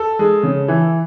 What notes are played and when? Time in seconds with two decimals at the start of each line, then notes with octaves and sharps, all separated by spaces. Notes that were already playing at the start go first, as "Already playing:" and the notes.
Already playing: A4
0.19 G#3
0.43 C#3
0.68 E3